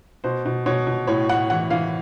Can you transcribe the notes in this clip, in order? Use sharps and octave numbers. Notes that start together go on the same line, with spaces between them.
B2 C5
B2
B2 C#5
B2
A2 C#5
A2 F#5
E3 F#5
E3 F5